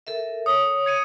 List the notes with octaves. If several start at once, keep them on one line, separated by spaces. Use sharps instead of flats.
A4 A#4 E5
C#5 D#6
G#6 C#7 D#7